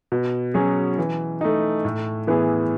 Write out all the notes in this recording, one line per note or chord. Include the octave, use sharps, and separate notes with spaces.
B2
F#3 C#4 G#4
E3
A3 D#4
A2
E3 B3 E4 G#4